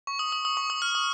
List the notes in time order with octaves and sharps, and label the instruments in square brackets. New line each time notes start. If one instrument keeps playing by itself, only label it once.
[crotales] C#6
D#6
D#6
D#6
C#6
D#6
F6
D#6